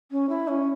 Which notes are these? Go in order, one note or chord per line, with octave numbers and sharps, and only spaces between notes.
C#4
E4
C#4